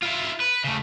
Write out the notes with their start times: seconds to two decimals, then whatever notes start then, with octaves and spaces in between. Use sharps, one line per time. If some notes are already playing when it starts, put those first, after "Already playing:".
0.03 E4 F4
0.40 B4
0.64 C#3 A3